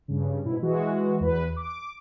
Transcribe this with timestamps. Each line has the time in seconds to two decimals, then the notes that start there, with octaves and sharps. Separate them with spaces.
0.08 G2 C#3
0.45 G#2 B2 E4
0.62 E3 G#3 F#4
1.20 E2 B4
1.56 D6